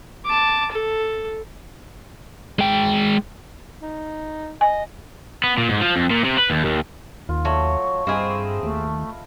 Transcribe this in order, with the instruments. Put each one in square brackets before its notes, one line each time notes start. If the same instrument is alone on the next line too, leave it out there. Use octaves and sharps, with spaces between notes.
[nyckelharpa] A5 D6
A4
[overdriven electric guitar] G#3 G5
[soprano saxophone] D#4
[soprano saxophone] D#5 [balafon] G#5
[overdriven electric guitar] B3
A#2
G#2
F3
F2
A#2
C3
B4
D#2
D#2
[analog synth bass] D#2 [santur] F4
[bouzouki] F#3 [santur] A3 [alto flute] C#6
[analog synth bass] G2 [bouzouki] C4 G#4 [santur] D#5 F5 B5
[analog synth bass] D#2 [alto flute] A3